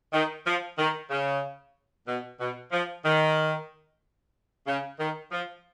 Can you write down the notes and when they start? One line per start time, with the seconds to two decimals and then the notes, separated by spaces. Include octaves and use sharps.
0.13 D#3
0.46 F3
0.78 D#3
1.11 C#3
2.08 B2
2.40 B2
2.72 F3
3.05 D#3
4.67 C#3
4.99 D#3
5.32 F3